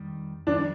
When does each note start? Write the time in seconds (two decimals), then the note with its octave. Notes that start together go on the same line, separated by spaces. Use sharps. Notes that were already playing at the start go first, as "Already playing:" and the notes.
Already playing: F2 D#3 G3
0.47 F2 D#3 G3 D4